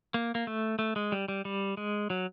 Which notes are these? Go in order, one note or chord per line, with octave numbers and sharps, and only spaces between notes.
A#3
A#3
A3
A3
G#3
G3
G3
G3
G#3
F#3